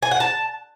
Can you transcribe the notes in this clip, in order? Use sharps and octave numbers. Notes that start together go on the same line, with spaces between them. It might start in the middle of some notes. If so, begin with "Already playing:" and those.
G#5
F#5
A5